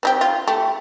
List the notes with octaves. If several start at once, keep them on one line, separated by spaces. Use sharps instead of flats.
C4 D#4 G4
F4
A3 G4